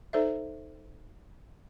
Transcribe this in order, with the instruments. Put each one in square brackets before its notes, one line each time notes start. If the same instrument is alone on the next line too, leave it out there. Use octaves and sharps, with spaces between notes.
[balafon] D#4 A4 C5 D5 E5